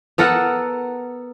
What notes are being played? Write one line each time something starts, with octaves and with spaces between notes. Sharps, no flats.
B3 A4 A#4 F#5